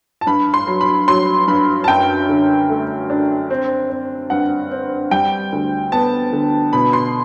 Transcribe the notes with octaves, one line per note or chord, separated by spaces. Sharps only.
A5
G2 B5
C6
F#3
B5
F#3 C6
G2 B5
A5
F#2 G5
D3
A3
D4
C4
C4
G2 F#5
C4
G3 G5
D2
B3 A5
D3
B2 B5
C6